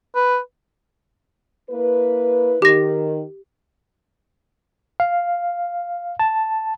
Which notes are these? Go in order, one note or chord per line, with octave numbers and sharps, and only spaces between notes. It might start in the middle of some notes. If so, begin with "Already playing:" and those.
B4
A#3 E4 B4
D#3 G4 A#6
F5
A5